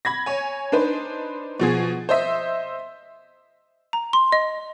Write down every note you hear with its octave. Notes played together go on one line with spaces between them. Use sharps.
B5 G#6 A#6
C#5 G#5
D4 D#4 B4 C5
B2 F3 G#4
C5 D#5 E5
A#5
C6
D#5